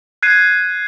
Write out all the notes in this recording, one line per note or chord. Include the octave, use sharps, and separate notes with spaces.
F#6 G#6 C7 D#7